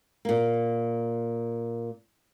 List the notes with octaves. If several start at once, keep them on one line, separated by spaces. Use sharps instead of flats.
A#2 A#3